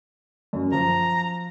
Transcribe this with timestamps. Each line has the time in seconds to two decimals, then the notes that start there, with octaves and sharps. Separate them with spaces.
0.53 F#2
0.72 F3 A#5